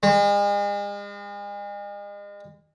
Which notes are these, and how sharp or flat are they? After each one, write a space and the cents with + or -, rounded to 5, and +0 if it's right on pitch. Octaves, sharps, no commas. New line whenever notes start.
G#3 -40